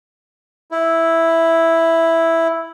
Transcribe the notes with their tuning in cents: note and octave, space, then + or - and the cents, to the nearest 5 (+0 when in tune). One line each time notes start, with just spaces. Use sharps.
E4 +0